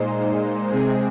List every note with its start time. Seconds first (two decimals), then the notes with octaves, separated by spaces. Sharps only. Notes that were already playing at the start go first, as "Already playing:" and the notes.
Already playing: A#2 G#3 D#4 C5
0.72 C3 G#3 C4 G#4